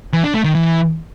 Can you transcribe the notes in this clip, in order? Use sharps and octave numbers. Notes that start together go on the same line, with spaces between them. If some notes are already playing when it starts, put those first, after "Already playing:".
E3
D4
A3
D#3
E3